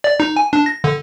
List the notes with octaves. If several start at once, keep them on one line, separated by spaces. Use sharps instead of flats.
D5
D#4
G#5
D4
A#6
D3